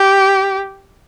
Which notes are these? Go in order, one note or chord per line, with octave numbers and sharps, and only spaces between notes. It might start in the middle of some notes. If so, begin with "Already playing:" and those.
Already playing: G4